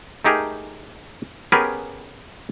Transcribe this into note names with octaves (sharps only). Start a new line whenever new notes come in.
A3 D#4 G4 G#4 A#4
B3 C#4 G4 G#4 A#4 B4